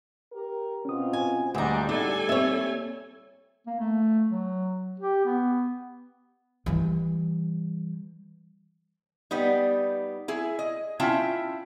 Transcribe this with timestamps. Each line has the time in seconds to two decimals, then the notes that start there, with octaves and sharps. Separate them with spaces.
0.33 G4 A#4
0.85 B2 C4 C#4 F4 D#6
1.13 G#5
1.55 D2 G3 G#3 D4 A#5
1.89 A2 G3 D4 D#4 A4 G#5
2.29 A#3 C4 G4 C#5 E5
3.67 A#3
3.79 A3
4.29 F#3
5.00 G4
5.25 B3
6.66 E3 G3
9.31 G3 B3 D#4
10.28 E4 G#4
10.59 D#5
11.00 C#4 E4 F4 E5 G5 A5